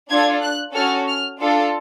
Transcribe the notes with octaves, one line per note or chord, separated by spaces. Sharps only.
D4 F4 A4 G#6
F#6
C#4 F#4 A4 F6
F6
D4 F4 A4